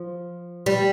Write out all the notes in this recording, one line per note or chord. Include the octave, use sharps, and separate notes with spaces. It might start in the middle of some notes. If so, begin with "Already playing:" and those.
Already playing: F3
G3